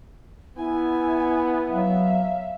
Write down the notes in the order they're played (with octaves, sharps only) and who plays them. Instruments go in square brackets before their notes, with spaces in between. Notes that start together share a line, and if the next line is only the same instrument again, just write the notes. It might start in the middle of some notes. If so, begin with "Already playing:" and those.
[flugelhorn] B3 [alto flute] E4 [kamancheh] G#5
[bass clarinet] F#3 [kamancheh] E5 F5